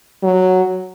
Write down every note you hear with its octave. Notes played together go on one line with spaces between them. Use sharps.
F#3